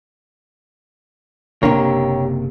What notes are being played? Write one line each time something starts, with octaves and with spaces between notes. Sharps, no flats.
F#1 C3 A#3 D4 G4 C#5